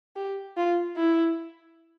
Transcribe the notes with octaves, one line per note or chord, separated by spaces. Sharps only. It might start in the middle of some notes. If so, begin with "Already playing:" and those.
G4
F4
E4